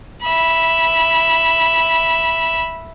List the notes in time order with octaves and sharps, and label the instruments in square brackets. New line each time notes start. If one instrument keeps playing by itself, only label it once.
[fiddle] E5 B5